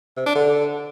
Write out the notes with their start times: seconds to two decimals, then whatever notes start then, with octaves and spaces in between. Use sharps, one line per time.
0.17 C3
0.26 D4
0.35 D3